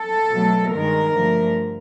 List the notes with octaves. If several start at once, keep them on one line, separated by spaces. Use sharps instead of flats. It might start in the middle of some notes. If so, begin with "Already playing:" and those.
Already playing: A4
B2 F#3 A3
G2 D#3 G#3 A#4
G2 D3 F3 A3